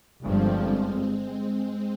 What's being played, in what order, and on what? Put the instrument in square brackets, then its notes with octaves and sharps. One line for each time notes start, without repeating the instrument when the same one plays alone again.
[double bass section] G1 G2 F3 [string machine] G#3 C4
[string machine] G#3 C4